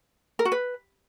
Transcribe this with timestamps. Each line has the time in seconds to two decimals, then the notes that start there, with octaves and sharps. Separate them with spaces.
0.39 A#4
0.45 F#4
0.52 B4